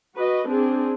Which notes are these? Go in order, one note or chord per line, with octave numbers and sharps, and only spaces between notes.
F#4 B4 D#5
C4 D4 G#4